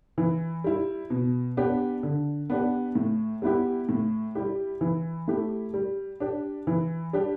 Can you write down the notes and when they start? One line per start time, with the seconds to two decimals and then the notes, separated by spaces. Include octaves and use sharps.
0.18 E3
0.64 G3 E4
1.10 B2
1.57 B3 D4 G4
2.03 D3
2.50 B3 D4 G4
2.95 A2
3.42 G3 B3 E4 G4
3.89 A2
4.35 G3 E4 G4
4.81 E3
5.28 A3 E4 G4
5.74 G3
6.20 D4 G4
6.67 E3
7.13 G3 D4 G4